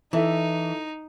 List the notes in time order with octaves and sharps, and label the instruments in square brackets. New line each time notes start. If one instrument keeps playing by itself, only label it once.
[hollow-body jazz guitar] E3 [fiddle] D#4 [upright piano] E4 A4 E5